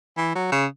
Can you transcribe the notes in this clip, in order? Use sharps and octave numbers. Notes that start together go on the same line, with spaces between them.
E3
F#3
C#3